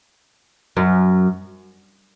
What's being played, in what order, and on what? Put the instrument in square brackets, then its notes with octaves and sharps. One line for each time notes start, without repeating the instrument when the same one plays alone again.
[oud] F#2